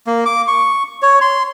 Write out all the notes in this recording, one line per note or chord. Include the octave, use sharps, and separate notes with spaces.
A#3
D6
C#6
C#5
C6